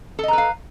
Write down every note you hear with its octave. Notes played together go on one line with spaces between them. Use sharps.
A4 B4 D#5 F5 A#5